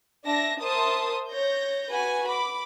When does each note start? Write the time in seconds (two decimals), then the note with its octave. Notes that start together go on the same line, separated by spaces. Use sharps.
0.25 D4 E5 A5 A#6
0.60 A#4 C5 E5 A5 C6 D#6
1.31 C#5 G6 A#6
1.89 F#4 B4 G#5
2.28 B5 D6